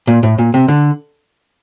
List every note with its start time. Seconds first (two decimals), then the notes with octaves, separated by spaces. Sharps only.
0.07 A#2
0.23 A2
0.38 A#2
0.54 C3
0.68 D3